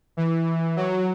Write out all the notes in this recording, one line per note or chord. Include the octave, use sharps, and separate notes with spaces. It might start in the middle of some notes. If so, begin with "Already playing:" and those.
E3
F#3